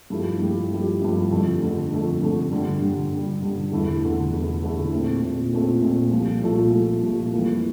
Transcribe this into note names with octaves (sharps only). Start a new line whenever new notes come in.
G2 F3 A3 E4 G4
G2 F3 A3 E4 G4
G2 F3 A3 E4 G4
G2 F3 A3 E4 G4
F2 D3 A3
F2 D3 A3
F2 D3 A3
F2 D3 A3
G2 D3 G3
G2 D3 G3
G2 D3 G3
G2 D3 G3
E2 D3 A3 E4
E2 D3 A3 E4
E2 D3 A3 E4
E2 D3 A3 E4
A#2 A3 C4
A#2 A3 C4
A#2 A3 C4
A#2 A3 C4
C2 A#2 F3 A3
C2 A#2 F3 A3
C2 A#2 F3 A3
C2 A#2 F3 A3
F2 E3 G3 A#3